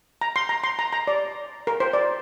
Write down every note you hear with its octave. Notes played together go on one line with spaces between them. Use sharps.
A#5
C6
A#5
C6
A#5
A#5
D5
A#4
C5
D5